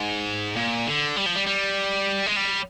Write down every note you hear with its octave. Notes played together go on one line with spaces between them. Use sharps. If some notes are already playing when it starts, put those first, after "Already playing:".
Already playing: G#2
A#2
D3
G3
F3
G3
G3
G#3
G3